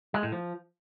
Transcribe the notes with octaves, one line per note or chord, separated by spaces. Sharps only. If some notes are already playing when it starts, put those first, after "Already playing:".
G#3
A2
F3